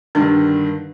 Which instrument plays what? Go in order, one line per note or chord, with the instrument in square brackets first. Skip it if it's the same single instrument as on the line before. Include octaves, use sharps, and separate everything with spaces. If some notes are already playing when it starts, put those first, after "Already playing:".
[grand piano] G2 D3 D#3 [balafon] D4